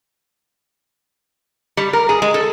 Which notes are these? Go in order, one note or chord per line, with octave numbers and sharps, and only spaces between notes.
G3
A#4
G#4
G#3
A4